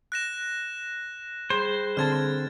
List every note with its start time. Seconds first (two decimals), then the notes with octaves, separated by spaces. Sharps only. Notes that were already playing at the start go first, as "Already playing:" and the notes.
0.12 F#6 A#6 E7
1.50 G3 G#4 C5 B5
1.97 D3 C4 A5 F6 G#6 A6